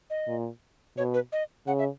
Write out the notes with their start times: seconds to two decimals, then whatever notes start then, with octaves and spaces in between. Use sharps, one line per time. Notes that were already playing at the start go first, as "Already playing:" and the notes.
0.10 D#5
0.27 A#2
0.97 B2 C#5
1.14 B4
1.32 D#5
1.67 C#3 F#5
1.79 E5